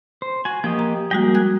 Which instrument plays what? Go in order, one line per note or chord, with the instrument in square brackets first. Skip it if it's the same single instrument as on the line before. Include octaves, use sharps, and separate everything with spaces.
[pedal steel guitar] C5
F#4 G#5
[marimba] F3 [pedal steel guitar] A#3 G4 D#5
[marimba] A#5
[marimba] G3 G#3 F#4 [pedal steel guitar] A#3 G#4 G5
[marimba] F#6 G#6